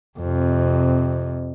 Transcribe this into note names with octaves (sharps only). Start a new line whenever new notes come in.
F2 C3